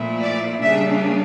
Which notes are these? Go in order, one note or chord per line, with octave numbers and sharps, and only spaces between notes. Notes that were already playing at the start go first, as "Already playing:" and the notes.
Already playing: A#2 F3 A3 E4
D5
C#3 G3 A#3 D4 E5